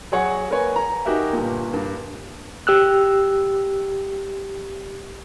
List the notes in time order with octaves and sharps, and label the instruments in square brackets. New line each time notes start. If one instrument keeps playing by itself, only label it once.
[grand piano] F#3 G#4 C#5 F#5 G#5 C#7
A#3 A#4 B4 C#5 G#5
A#5
D#4 F#4 G4 A#4 E5 G#5
G1 A#2
G2 A#3
[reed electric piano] G4 E6 F#6